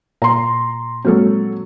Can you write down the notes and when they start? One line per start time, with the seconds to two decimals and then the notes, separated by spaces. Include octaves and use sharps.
0.22 A#2 A#5 C6
1.05 F#3 G#3 A#3 C4 A4